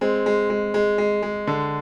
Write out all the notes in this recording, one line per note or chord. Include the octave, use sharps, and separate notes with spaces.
G#3 C4
G#3
G#3
G#3
G#3
G#3
D3